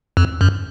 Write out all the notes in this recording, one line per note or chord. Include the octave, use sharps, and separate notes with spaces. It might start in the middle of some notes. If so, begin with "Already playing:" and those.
F2
F#2